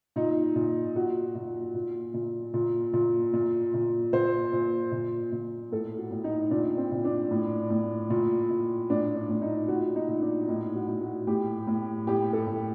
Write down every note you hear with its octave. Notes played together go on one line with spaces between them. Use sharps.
A#2 D#4
A#2
A#2 F#4
A#2
A#2
A#2
A#2
A#2
A#2
A#2
A#2 C5
A#2
A#2
A#2
A2 A4
F#4
A2
D#4
A#2 D4
C4
A#2
D4
A2
A2
A#2
A#2
A2 D4
D4
A2
D#4
A#2 F#4
D#4
A#2
D4
A2 D#4
F#4
A2
F#4
A2 G4
A2
A2 G4
A4
A2